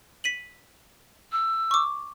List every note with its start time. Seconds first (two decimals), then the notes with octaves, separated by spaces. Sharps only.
0.24 B6 D#7 F#7
1.32 E6
1.71 C#6 D6